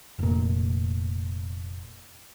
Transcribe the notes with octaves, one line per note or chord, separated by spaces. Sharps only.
F1 A#2